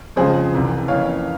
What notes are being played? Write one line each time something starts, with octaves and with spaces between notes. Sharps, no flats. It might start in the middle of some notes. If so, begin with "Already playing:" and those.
F2 C#3 F3 G#3 C4 G#4 C5
C2 C3 E3
F2 E3 A#3 C#4 C#5 F5